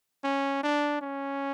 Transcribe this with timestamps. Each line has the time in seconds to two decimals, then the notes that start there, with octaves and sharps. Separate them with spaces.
0.24 C#4
0.63 D4
1.01 C#4